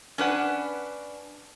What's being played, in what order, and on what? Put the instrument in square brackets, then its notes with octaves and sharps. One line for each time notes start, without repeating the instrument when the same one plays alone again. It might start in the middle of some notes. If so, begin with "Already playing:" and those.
[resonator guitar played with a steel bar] C#4 D4 B4 F#5